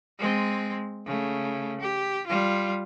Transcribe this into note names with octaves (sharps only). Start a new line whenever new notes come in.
G#3 C4
C#3 A3
G4
G3 F4